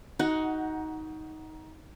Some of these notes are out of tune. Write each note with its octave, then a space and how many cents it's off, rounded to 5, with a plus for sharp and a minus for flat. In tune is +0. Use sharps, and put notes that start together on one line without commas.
D#4 +15 F#4 +15 F#5 +0